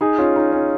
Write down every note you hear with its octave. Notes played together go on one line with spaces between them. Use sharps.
D#4 G#4
C#4 F4
D#4
C#4